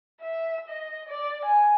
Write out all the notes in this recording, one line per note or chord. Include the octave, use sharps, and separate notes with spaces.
E5
D#5
D5
G#5